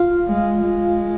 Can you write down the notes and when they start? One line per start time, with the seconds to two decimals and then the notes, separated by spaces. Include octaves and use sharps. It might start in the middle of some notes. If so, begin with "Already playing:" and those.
Already playing: F4 F5
0.28 G#3
0.63 G#3